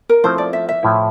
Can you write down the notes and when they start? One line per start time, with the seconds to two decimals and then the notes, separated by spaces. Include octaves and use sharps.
0.09 A#4
0.24 F3 A3 C4 E4 C5
0.38 D5
0.53 E5
0.69 E5
0.83 A2 F3 A3 E4